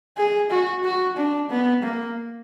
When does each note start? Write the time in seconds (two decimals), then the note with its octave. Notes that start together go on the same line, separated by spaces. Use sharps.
0.17 G#4
0.51 F#4
0.84 F#4
1.17 D4
1.50 B3
1.83 A#3